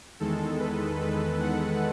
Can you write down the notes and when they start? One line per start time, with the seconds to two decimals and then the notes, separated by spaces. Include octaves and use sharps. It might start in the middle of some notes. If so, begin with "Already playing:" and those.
0.20 E2 D#3 G#3 A4
0.60 B4
1.01 B4
1.40 F#5